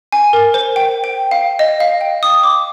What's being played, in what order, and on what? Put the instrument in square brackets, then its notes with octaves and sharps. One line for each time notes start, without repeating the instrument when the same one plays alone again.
[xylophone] G#5
A#4
C5
G5
G5
F5
D#5
F5
G5
D#6
D6